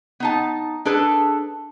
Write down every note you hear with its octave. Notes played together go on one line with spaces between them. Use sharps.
B3 D#4 A5
D4 G#4 A4 B4